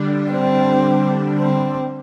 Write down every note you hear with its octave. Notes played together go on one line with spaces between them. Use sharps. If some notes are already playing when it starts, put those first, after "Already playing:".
Already playing: D3 G3 D4
C4
C4